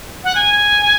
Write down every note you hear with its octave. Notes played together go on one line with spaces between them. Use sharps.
F#5
G#5